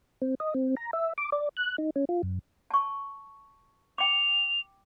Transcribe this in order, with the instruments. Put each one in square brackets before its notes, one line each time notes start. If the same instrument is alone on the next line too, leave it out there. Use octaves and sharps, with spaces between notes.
[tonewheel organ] C4
D#5
C4
A#5
E5
D6
D5
F#6
D#4
C#4
F4
F#2
[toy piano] A5 C#6
[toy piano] G5 D6 [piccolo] F7